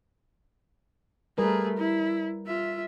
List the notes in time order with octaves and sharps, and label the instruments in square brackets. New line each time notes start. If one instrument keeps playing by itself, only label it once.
[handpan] G3 A#4 B4 [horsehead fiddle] A3 G#4
[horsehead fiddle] E4
F4 E5